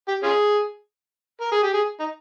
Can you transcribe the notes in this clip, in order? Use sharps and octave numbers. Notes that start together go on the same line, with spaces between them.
G4
C#4 F4 G#4
A#4
G#4
G4
G#4
D#4